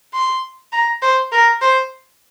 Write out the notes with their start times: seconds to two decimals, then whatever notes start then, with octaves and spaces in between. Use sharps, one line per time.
0.13 C6
0.72 A#5
1.02 C5
1.32 A#4
1.61 C5